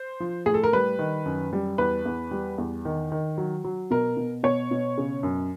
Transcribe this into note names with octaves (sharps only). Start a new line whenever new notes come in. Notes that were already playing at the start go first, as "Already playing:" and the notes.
Already playing: C5
F3
A2 G#4
A4
A#4
G3 B4
D#3
F#2
G3
E2 B4
E2
G3
E2
D#3
D#3
F#3
F#3
B2 A#4
B2
B2 C#5
B2
C#3
F#2